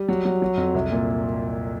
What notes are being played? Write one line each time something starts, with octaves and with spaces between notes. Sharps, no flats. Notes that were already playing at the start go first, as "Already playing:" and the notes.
Already playing: G3
F#3
F#3
F#3
F2
C2
A#2